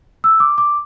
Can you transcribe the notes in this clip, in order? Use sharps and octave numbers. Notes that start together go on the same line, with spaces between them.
E6
D6
D6